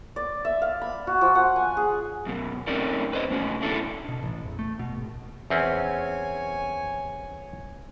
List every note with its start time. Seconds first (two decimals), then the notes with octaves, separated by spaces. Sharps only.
0.16 D5
0.45 E5
0.62 F5
0.81 B5
1.07 F#4
1.21 F3
1.35 F#5
1.56 G#5
1.77 G#4
2.26 F#2 B2
2.67 A3 C4 C#4 D#4 A#4 D5
3.13 B4 C5 D#5
3.31 A3 C#4 F#4
3.61 B2 D4 E4 A4
4.09 B2
4.23 A1
4.45 E2
4.59 A3
4.79 B2
4.94 G#1
5.50 E2 C4 C#4 C#5 G#5